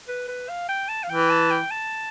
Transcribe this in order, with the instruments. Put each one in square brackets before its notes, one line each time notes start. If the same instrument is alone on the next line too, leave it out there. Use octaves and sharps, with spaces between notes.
[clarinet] B4
B4
F5
G5
A5
F5
[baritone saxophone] E3 [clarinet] G5
[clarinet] A5
G5
A5